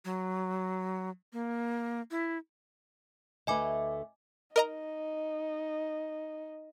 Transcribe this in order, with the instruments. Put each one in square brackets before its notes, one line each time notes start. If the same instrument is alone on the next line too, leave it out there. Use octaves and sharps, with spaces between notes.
[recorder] F#3
A#3
E4
[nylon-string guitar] D2 A3 B4 [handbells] D#5 G#5 D6
[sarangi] D#4 [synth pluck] A#4 D#5 A#5